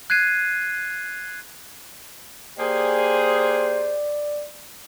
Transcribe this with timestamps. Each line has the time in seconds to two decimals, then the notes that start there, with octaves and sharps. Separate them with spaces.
0.10 F#6 G#6 C7 D#7
2.59 A#3 G4 G#4 C5 D5